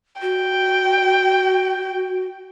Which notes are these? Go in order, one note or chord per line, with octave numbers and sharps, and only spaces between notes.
F#4 G5